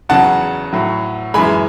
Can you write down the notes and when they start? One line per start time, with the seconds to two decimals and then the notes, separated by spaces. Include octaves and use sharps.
0.09 E2 C#3 F#3 F#5 A5
0.73 A2 F#3
1.34 F#2 E3 G#3 G#5 B5